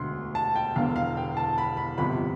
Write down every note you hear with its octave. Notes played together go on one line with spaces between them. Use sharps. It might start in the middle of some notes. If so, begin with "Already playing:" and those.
Already playing: E1 D2 D3 C6
A5
G5
E1 E2 D3 F5
F5
G5
A5
B5
B5
G1 F2 C3 B5